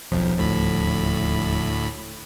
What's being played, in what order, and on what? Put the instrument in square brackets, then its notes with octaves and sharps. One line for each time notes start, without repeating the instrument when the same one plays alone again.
[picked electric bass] D#1 F3 [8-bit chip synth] B1 F2
[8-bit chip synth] D2 A2 B5